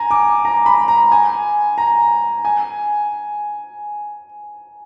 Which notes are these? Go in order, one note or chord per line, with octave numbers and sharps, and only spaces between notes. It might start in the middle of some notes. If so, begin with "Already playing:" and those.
Already playing: G#5 A#5
D6
A#5
B5
A#5
G#5
A#5
G#5